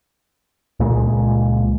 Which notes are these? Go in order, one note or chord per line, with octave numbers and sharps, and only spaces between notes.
C#2 A#2 G#3